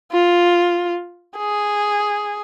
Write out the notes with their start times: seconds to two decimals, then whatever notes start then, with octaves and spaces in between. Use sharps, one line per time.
0.12 F4
1.38 G#4